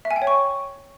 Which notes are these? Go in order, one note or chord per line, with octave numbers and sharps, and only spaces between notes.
E5
G#5
G5
C#5
C#6